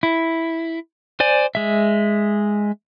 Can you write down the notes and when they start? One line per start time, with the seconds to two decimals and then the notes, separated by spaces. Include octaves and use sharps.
0.03 E4
1.20 C5 D5 G#5
1.55 G#3 E5